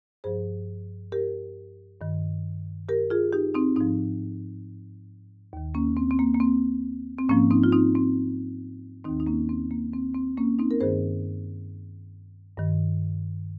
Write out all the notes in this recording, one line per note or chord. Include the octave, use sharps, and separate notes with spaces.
G2 F3 G#4 C5
G4 A#4
G2 D#3
G4 A#4
F4 G#4
D#4 G4
C4 D#4
G#2 F3 C4 D#4
D#2 D#3
A#3 C#4
C4
C4
A#3
A#3
C4
C4
G#2 F3 A#3 C#4
C4 D#4
F4
C4 D#4
C4
D#2 D#3 C4 D#4
D#4
A#3 C#4
C4
A#3
C4
C4
A#3 C#4
C4 D#4
A#4
G2 D#3 G#4 C5
G2 D#3